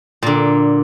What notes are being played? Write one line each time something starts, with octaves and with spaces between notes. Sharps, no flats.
A#2 D3